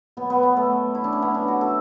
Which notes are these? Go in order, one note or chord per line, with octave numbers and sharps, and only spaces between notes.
B2 F#3 B3
B3
B3
A3
E4
D4
C#4
B3
D4
F#4
A4